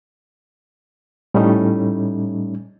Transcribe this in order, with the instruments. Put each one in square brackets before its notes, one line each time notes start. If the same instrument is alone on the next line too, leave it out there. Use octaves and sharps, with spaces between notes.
[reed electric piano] A2 G3 A3 C#4 D#4